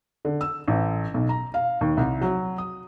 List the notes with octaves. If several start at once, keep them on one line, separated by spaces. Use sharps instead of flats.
D3
E6
A1
B1
A#5
F5
D#2
C2
F#3
D#6